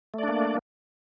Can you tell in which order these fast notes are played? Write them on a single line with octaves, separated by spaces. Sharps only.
A3 D5 D4 A#3